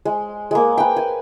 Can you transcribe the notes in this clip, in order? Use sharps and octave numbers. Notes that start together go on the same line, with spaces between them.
G#3
G#3 A#3
B4 G5
G#5